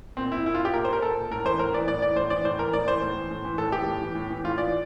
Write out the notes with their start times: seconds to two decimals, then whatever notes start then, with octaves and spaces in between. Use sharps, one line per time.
0.17 A#2 C4
0.32 E4
0.46 A#2 E4
0.55 F4
0.65 G4
0.74 A#2 A#4
0.85 C5
0.93 A#4
1.02 A#2 A4
1.31 A2 A#4
1.45 E3 C5
1.59 A2 A#4
1.73 E3 D5
1.87 A2 D5
2.02 E3 D5
2.16 A2 C5
2.30 E3 D5
2.44 A2 C5
2.59 E3 A#4
2.73 A2 D5
2.87 E3 C5
3.02 A2
3.16 E3
3.31 A2
3.45 E3
3.58 A2 A4
3.72 E3 G4
3.87 A2
4.02 E3
4.15 A2
4.30 E3
4.44 A2 F4
4.58 E3 D5